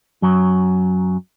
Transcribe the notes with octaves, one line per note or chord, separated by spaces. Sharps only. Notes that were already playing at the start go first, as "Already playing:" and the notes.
F#2 F#3